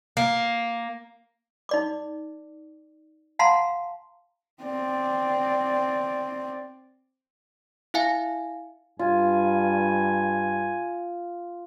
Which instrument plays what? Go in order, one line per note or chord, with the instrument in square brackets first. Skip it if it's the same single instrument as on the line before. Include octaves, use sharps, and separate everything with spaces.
[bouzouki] A#3
[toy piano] D#4 D5 D6
F5 F#5 A5 A#5 C6
[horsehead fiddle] C4 D5
[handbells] E4 E5 F5 G#5
[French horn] G2 [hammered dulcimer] F4 [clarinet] G#5